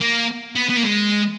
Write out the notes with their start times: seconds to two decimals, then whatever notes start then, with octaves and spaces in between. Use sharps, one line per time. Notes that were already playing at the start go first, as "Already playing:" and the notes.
0.01 A#3
0.56 B3
0.70 B3
0.77 A#3
0.83 G#3